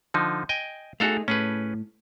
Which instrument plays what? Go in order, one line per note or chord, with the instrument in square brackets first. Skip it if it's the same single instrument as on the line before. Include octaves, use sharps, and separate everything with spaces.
[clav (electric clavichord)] D3 F3 D#4
D#5 G5 G#5
[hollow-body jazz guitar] A3 D#4 G#4 [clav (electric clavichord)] F#4 A4 F5
[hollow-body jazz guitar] A2 [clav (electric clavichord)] C#4 G#4 B4